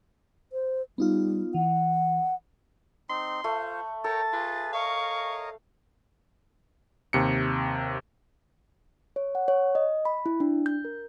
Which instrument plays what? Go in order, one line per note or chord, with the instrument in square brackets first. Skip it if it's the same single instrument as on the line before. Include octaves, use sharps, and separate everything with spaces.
[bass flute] C5
[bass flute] G3 [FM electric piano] B3 D#4 F4
[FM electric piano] E3 [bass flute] F#5
[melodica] C4 D#4 [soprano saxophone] C6
[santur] A3 [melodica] F4 C5
[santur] A4 [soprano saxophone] A#4 [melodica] C#5 G5 A#5 [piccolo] A6
[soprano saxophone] F4 [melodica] G#4 B4
[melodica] A#4 C#5 D#5 [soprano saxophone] F5 [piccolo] C#6
[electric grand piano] D#2 C3 C#7
[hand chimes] C#5
F#5
C#5
D#5
B5
E4
D4
G6
A#4